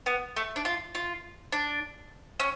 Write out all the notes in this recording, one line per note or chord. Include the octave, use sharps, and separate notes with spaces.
B3
A3
D4
F4
F4
D4
C#4